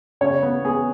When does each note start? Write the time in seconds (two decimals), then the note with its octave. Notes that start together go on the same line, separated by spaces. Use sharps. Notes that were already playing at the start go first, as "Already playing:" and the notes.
0.21 C#3 C#5
0.43 B3
0.65 B3 G#4